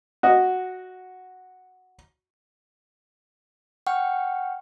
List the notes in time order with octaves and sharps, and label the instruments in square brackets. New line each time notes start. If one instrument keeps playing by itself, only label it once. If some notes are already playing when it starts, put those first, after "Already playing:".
[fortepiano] F#4 D#5
[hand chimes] F#5 G5 C#6 F6